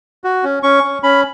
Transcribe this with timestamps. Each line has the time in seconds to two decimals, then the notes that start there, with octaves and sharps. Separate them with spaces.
0.24 F#4
0.44 C#4
0.63 C#4 C#6
0.83 C#4
1.03 C#4 B5